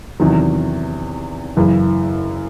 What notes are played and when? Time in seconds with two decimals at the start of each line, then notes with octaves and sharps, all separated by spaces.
0.20 E2 C3 D#3 F#3
1.57 F#1 F#2 C#3 E3